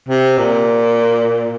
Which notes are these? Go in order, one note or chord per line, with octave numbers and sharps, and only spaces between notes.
C3
A#2